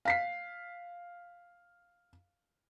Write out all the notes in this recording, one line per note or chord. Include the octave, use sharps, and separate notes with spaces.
F5 B6 C7